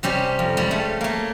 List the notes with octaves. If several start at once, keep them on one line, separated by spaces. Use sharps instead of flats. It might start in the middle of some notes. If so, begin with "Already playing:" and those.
C3 G3 C#4 G4
F2
G3 G#3 C#4
A3
A3 A#3